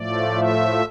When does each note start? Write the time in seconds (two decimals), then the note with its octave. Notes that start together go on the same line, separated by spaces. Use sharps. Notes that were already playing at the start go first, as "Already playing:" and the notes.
Already playing: A2 F3 A3 D5
0.39 E5